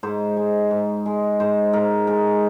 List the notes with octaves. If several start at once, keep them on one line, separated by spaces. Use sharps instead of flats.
G#2 C5
G#3
G#2
G#3
G#2 C5
G#2 A#4
G#3 A#4